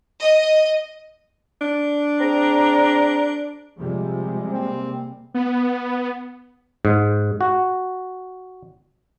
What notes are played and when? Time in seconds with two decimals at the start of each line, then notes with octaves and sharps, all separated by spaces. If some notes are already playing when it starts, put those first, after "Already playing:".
0.21 D#5
1.61 D4
2.20 C4 G#4 A#5
3.78 C3 F3 G3 G#3
4.51 A#3 C4
5.34 B3
6.85 G#2
7.41 F#4